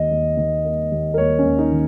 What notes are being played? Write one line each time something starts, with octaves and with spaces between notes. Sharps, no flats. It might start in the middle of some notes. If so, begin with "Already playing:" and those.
Already playing: D#2 D#3 D#5
D#2
D#3
A#3
D#2
A#4
D#2 C#5
C#4
D#2
D#4
D#3